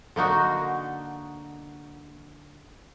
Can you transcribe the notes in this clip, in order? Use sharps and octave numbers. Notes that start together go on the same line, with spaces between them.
D3 A#3 D#4 F#4